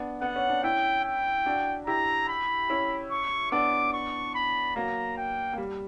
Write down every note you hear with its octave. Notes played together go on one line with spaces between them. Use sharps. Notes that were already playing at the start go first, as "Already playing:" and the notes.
Already playing: B3 D4
B3 F#5
C#4
D4
C#4 E4 G5
G5
D4 F#4
E4 G4 A#5
B5
C#4 E4
C#6
B3 D4 D6
C#6
B5
F#3 A#3 A#5
G5
A#3
G3